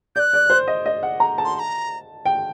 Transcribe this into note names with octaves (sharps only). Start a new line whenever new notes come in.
D5 G6
F#6
D5
C5
D#5
D#5
F#5
A#5
A5
C6
C6
A#5
G5